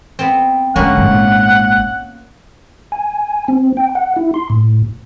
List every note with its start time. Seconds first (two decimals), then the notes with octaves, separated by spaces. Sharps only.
0.19 B3 C4
0.76 G#2 D3 A#3 B3 C#4 F#5
0.97 G#1 A#2
2.92 G#5
3.48 C4
3.77 G5
3.95 F#5
4.16 E4
4.34 C6
4.50 A2